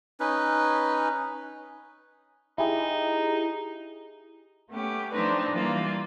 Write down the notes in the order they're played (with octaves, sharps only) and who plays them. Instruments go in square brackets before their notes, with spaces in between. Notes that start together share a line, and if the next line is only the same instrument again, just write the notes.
[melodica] C#4 D#4 B4
[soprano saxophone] D#4 [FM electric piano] E4 G4 G#4
[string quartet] A3 B3 C#4 G4
F3 A3 C4 D4 D#4 B4
E3 G3 A#3 F4